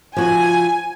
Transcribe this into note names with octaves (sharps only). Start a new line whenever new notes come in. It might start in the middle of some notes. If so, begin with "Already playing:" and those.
F3 F#4 G#5